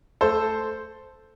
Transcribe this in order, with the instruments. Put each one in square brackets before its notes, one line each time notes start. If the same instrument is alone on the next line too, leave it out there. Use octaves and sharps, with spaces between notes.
[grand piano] A3 A4 C5